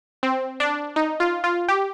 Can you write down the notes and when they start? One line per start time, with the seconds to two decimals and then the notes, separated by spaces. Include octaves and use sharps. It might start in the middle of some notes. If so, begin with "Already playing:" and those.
0.23 C4
0.60 D4
0.96 D#4
1.20 F4
1.44 F4
1.68 G4